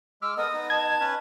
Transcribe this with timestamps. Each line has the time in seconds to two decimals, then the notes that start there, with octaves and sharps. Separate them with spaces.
0.22 G#3 D6 E6 F6
0.37 B3 A4 A#4 D#5 D#6
0.53 B3 D#4
0.70 A5 G#6
1.01 C#4 B4